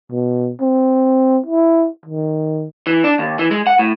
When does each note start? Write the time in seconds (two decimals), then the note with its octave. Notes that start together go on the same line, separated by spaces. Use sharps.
0.11 B2
0.61 C4
1.46 E4
2.05 D#3
2.87 E3
3.04 D4
3.19 D#2
3.39 E3
3.51 G#3
3.67 F#5
3.79 A2